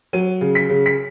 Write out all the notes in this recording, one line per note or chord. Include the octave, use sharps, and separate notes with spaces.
F#3 D#7
C#3
B6
C#3
B6